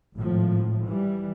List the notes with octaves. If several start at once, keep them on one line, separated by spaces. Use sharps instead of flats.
G#1 A2 F3
E3 G3